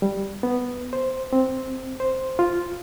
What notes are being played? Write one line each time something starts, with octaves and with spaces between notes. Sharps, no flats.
G3
B3
C5
C4
C5
F4